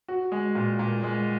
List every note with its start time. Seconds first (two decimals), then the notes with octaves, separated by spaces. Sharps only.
0.08 F#4
0.32 G#3
0.55 A#2
0.79 A#2
1.03 G#3